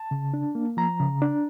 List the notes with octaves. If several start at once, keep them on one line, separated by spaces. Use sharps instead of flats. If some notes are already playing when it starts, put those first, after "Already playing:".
Already playing: A5
C#3
D4
A#3
F3 A#5
C#3
D4